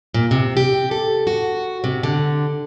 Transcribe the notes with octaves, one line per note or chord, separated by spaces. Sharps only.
A#2
C3
G4
A4
F#4
C3
D3